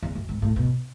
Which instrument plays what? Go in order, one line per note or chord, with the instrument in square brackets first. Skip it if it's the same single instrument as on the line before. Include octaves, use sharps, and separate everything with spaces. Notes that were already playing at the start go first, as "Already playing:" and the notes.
[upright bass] E2
F#2
G#2
A2
B2